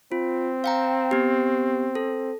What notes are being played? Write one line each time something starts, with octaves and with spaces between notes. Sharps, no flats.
C4 F4
F5 G5 A#5
B3 G4
A4